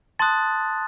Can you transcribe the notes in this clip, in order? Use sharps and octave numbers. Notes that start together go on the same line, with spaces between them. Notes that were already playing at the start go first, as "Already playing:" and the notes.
A5 C6 D#6 F#6 A6